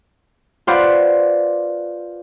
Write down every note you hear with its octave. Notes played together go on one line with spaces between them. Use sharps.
F4 B4 C5 D5 F5 F#5